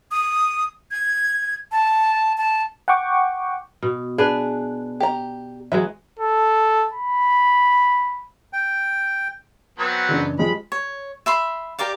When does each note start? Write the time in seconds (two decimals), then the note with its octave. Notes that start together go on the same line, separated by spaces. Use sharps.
0.11 D#6
0.91 G#6
1.72 A5
2.38 A5
2.88 F#5 G5 C#6 D6
3.82 B2
4.18 D4 G#4 B4
5.00 G4 A#5
5.72 E3 F#3 G#3 E5
6.19 A4
6.93 B5
8.53 G5
9.79 F#3 B3 C4
10.09 F#1 E3 D4
10.39 F3 G3 G#3 B5
10.72 C#5
11.26 E5 B5 C6
11.79 G4 A#4 D5 F5